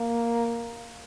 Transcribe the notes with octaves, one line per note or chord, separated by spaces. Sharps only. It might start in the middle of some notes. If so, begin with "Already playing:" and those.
Already playing: A#3